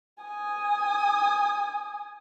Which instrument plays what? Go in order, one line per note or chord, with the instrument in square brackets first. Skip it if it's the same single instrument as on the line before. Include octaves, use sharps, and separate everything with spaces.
[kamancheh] G#5 D#6